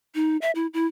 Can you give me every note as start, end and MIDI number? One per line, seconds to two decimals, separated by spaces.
0.15 0.37 63
0.42 0.51 76
0.55 0.67 64
0.74 0.86 64